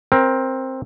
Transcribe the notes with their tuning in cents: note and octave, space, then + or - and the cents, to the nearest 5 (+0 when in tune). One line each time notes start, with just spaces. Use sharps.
C4 +10 A#4 +20